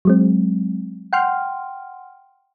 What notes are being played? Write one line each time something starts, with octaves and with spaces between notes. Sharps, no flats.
F#3 G#3 C4
F#5 G5 C6 F6